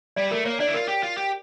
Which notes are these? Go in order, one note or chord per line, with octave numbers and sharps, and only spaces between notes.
G3 D5
A3 A#4
A#3 C#5
D4 D5
E4
F4 A#4
G4
F4
G4